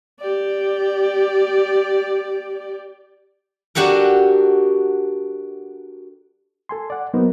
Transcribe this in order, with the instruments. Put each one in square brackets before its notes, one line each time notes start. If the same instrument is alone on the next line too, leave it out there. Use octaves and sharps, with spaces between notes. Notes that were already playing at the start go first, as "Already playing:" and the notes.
[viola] G4 D5
[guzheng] D4 F#4 G4 A4 A#4
[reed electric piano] A4 G#5 C6
D5 F#5
F#3 A#3 B3 D#4 A#4 C5